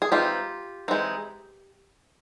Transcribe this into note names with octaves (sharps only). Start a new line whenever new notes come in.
G#4
E3 G#3 C4 D#4 F4 G4
E3 G#3 C4 D#4